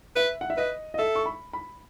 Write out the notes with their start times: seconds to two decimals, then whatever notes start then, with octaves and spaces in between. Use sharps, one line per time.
0.16 B4 E5
0.41 F#5
0.50 E5
0.57 B4 D#5
0.94 D#5
0.98 A4 E5
1.16 C#6
1.26 B5
1.53 B5